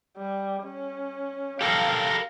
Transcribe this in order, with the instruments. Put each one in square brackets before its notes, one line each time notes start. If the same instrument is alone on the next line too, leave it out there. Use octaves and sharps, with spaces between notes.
[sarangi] G3
C#4
[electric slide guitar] G4 A4 A#4 [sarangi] F5